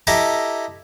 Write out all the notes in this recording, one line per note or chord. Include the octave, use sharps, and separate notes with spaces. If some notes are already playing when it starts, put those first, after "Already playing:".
E4 G4 A4 D#5 A#5 D6